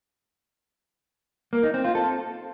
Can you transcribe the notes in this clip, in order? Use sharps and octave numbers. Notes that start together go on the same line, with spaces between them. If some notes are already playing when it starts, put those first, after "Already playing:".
A#3
D#4
C4
F4
A4